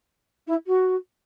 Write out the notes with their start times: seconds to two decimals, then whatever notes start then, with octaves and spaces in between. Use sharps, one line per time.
0.47 E4
0.66 F#4